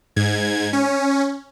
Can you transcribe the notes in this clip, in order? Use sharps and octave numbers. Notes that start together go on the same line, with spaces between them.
G#2 G#6
C#4